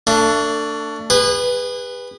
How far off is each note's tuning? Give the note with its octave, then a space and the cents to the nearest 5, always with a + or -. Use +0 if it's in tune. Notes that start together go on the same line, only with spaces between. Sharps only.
A3 +35 D4 +0
G#4 -35 B4 +0